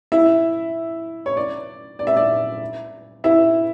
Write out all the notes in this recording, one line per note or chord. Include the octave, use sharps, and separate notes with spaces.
E4 E5
C#5
D5
D5
E5
D5
E4 E5